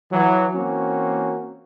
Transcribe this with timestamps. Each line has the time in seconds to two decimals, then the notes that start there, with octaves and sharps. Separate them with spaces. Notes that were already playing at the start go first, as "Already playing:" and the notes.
0.12 E3 F#3
0.55 E3 A#3 C4 C#4 F#4